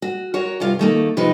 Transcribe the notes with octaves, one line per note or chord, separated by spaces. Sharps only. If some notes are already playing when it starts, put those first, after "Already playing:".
F#4
F#4 A#4 C#5
G2 C3 F4 F5
D#3 A3 A#3
C3 F3 D#4 B4